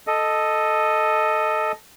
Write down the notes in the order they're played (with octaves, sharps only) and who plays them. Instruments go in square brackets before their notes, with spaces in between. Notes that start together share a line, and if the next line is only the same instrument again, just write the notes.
[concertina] A4 D#5